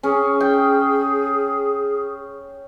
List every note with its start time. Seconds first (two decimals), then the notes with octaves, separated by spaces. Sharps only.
0.03 C#4 G#4
0.40 G5